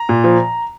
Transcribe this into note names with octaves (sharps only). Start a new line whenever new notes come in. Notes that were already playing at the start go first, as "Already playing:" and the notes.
Already playing: A#5
A#2
F3